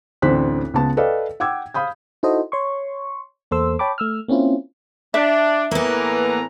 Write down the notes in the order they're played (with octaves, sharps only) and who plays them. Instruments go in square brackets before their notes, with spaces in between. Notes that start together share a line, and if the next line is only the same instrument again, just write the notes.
[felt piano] A1 D2 C4 D4 F#6 B6
C#2 B3 A5
A4 B4 D5 D#5 F5 G5
F#5 G5 D6 E6 G#6
F5 B5 D#6 G6
[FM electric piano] D#4 E4 F#4 A4 C5 D#5
C#5 C6 C#6
E2 A#3 A4 C5 C6 E6
C#5 G5 A5 B5 D6
A3 E6 F6
A#3 C4 C#4 E4 F4
[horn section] D4 [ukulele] E5
[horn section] A2 E3 A#5 [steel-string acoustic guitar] A#3 B3